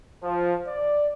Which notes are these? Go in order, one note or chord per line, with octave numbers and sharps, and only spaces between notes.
F3
D5